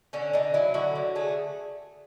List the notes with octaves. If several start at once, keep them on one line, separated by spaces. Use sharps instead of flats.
D3 C#4
D3 D#4
F#3 E4
D3 F#4
D3
A3 G#4